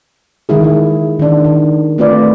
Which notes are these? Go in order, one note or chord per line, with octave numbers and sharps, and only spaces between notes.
D#3 G#3 E4 G#4
E4
D#3 D4
D#3
A3 C4 F4 B4 D5